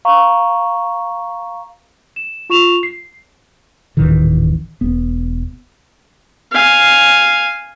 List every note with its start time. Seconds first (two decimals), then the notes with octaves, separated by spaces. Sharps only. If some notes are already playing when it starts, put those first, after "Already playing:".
0.05 F5 A#5 C#6
2.16 E7
2.50 F4 C#6 E7 F7
2.83 C7
3.97 D#1 A1 D#3 E3
4.81 E1 B3
6.52 F5 G#5